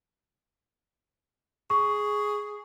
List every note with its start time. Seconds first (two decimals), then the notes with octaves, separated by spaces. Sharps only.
1.70 G#4 C#6